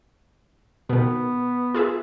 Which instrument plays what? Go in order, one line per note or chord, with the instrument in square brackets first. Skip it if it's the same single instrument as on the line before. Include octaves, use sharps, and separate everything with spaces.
[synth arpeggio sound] B2 D#3 [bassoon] B3
[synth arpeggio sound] F4 G#4 E5